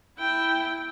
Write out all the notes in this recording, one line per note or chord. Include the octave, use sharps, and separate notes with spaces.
E4 G5